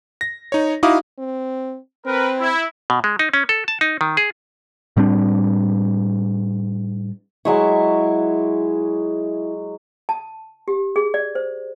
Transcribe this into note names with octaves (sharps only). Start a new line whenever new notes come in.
A#6
D#4 C#5
D#4 E4 F#4 F5 D6 D#6
C4
C4 A#4 B4
E4
B2
G#3
D#4
C#4
A4
A5
D#4
D#3
G#4
A2 G3 C4 D4
F#3 G#3 E4 C#6
A5
G4
G#4
D5
C5